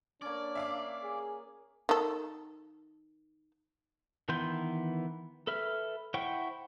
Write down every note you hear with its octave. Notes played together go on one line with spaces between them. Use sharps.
A#3 C#4 D4 D5
E5 F5 D6
G#4
D#3 A4
D#3 E3 B3 C6 G6
A4 B4 E5 F6
E4 C5 F#5 G5 C#6